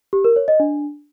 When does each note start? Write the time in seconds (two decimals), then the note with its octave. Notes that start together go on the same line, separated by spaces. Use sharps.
0.13 G4
0.25 A#4
0.36 C#5
0.48 D#5
0.60 D4